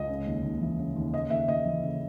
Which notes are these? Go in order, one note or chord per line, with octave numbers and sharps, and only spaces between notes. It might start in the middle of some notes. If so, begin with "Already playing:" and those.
Already playing: C#2 D#5
C#3
D#2
D#2
E3
C#3
D#2
C#3 D#5
D#2 E5
D#2 D#5
E3
C#3